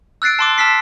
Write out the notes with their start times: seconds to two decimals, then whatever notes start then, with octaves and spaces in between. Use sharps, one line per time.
0.22 E6 F#6 A6 C7 D7
0.39 A5 C6 D6
0.58 A5 E6 F6 B6 C7